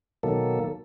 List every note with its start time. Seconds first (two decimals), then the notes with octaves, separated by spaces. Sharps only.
0.23 B2 D#3 F#3 A#3 A4